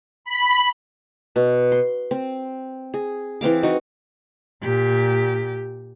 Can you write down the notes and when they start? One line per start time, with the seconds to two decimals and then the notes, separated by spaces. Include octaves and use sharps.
0.25 B5
1.36 B2
1.72 C6
2.11 C4
2.94 G#4
3.41 E3 C4 F5 D6
3.63 D#4 F#4
4.63 A#2 G4